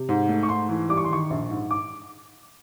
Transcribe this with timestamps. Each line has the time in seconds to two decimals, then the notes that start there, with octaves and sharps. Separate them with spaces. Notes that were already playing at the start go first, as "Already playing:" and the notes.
Already playing: C3
0.09 G#2
0.29 A3
0.43 C#6
0.49 G#2 C6
0.69 E3
0.89 G3 D6
0.97 C#6
1.04 C6
1.10 D#3 C#6
1.30 A#1
1.49 G#2
1.71 D6